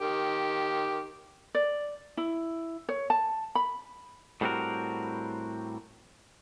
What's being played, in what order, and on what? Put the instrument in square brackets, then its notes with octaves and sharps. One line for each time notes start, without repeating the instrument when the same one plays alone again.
[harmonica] D#3 G4
[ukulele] D5
E4
C#5
A5
B5
[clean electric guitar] A2 G3 C4 D4 F#4 A#4